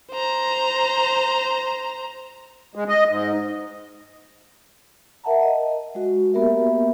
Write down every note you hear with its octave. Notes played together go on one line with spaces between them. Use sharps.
C5 A#5
G#3
D#5
G#2
A#4 E5 F#5 A5 A#5
D#5
G#3 F#4
A#3 B3 G4 A#4 E5